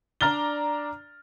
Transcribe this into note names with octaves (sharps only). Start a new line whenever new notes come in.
D4 D5 A#5 F6 A6 G7